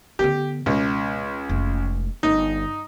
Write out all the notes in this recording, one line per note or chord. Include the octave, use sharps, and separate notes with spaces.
D3 B3 G4
C#2 B2
F1 G#3
G1 D#4